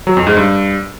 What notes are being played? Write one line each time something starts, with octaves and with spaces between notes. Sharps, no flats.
F#3
F2
G#2
G2